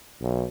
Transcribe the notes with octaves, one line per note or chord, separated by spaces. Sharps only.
B1